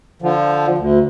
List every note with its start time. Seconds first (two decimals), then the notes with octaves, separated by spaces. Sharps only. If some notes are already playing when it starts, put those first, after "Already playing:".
0.22 D3 F3
0.78 D2